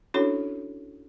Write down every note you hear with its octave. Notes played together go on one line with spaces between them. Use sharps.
C#4 D4 E4 F#4 A4 C#5